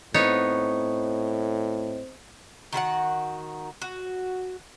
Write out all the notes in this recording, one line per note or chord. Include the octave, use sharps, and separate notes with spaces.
A2 B3 C4 D#4 C5 C#5 D#5
D#3 F#4 B4 F#5
F#4